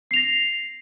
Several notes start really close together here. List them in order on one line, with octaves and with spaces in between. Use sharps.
C7 F7 A#6